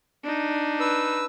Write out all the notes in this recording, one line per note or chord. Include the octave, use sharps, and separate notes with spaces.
D4 D#4
B4 E6